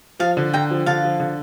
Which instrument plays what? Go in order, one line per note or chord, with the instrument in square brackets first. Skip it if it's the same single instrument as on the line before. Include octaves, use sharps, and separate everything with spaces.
[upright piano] F3 [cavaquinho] F5 A5
[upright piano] D3
[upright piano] D3 [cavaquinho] G5 A#5
[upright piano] F3
[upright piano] D3 [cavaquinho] F5 A5
[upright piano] F3
D3